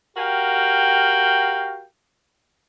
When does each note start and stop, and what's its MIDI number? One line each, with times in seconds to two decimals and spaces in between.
0.17 1.84 66
0.17 1.84 67
0.17 1.84 70
0.17 1.84 77
0.17 1.84 79